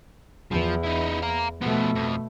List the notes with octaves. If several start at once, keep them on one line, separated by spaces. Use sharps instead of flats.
E2 F3
D#4 E4
F5 A#5
B2 F3 A3 B3
F2